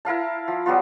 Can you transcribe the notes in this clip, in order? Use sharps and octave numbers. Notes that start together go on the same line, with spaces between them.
E4 A#4 F5 A5
F3
F#3 G3 B3 F4